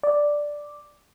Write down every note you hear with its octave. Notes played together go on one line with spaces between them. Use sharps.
D5